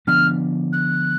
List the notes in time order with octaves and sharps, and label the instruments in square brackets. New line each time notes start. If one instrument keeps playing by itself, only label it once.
[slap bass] D3 F3 B3 D4 [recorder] F6
[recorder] F#6